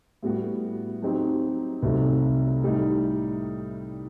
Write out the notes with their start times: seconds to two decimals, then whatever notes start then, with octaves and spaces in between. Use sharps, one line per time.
0.23 A2 G3 B3 F#4
1.02 F#3 C4 D#4 G4
1.83 C2 C3 F#3 A3 D#4
2.62 A2 G3 D#4